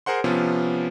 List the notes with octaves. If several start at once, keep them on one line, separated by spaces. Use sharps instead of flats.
G#4 A#4 C5 F#5 C6
C3 F3 B3 C#4 F4